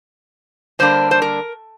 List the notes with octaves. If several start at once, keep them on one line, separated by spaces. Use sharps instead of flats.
D3 G3 A#3 D4 C5
C5
A#4